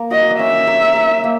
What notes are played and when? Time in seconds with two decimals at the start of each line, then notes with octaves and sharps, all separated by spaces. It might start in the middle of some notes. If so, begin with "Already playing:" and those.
Already playing: A#3 A#4
0.11 F#4 D#5
0.39 C#4 E5
0.67 A#4
0.96 A#4
1.24 A#3